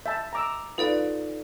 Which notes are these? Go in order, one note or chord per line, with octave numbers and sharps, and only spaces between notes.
E5 A5 G6
A#5 D6 E6
D#4 F4 A4 B4 D5 F#5